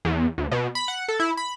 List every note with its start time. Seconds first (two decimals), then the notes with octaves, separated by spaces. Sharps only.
0.05 E2
0.38 D2
0.51 B2
0.75 B5
0.88 F#5
1.08 A4
1.20 E4
1.37 B5